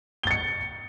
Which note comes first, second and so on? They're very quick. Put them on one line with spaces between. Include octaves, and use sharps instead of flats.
G7 A6 C#7